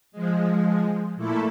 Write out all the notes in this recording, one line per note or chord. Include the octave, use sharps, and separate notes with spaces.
F3 G#3
A#2 A3 A#3 E4 A4